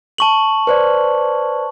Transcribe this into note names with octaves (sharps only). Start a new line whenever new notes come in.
A5 C#6 F#7
B4 C5 D5